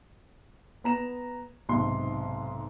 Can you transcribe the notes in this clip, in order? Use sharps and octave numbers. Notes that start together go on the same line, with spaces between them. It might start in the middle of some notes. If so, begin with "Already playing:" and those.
B3 A#5 E7
B1 G#2 C3 C6